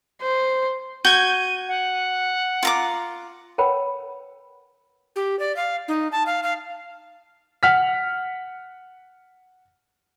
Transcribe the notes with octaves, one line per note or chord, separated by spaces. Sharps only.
C5
F#4 G6 G#6 D#7
F#5
F4 A#5 D6
A#4 B4 C#5 F#5 G5 B5
G4
D5
F5
D#4
A5
F5
F5
F#5 F6 B6